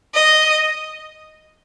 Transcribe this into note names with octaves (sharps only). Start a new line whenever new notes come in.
D#5